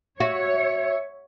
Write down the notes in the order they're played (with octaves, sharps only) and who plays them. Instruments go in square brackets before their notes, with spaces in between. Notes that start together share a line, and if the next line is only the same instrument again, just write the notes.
[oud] F#4 [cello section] C#5 [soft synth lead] E5